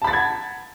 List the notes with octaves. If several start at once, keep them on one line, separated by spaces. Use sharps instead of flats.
F#5 A5 B5 G#6 A6